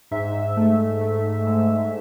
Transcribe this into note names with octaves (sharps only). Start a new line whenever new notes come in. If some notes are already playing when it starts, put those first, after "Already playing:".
G#2 E5
A3
A3
G#2